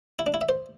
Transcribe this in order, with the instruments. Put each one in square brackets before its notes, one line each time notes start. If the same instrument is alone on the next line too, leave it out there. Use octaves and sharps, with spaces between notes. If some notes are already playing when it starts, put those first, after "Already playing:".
[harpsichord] E4
D4
E4
E5
C5